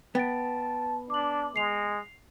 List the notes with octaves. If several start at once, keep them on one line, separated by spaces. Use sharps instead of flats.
B3 G5 A5 A6 D7
D4 D6 F#7
G#3 C7 F7